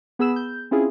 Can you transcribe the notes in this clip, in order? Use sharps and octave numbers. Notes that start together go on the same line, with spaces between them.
B3 G#4 B5 E6 E7
G6
C4 C#4 E4 F4 G#4